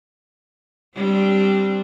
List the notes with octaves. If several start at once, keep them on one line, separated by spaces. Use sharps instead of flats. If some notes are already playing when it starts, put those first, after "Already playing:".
G3 C4 D4